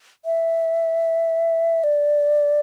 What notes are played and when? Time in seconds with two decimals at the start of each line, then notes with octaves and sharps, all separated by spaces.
0.25 E5
1.84 D5